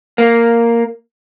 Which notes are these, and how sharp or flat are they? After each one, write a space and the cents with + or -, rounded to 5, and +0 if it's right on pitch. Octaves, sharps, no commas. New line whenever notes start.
A#3 -5